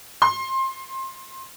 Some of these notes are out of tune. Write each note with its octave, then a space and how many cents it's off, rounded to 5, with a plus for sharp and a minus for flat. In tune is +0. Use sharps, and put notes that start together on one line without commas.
C6 +20